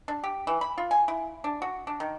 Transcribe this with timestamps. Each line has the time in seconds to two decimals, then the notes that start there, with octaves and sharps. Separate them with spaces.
0.08 D4
0.24 G4
0.47 E3
0.61 B5
0.78 F4
0.91 G#5
1.08 E4
1.44 D4
1.62 F#4
1.87 D4
2.00 D#3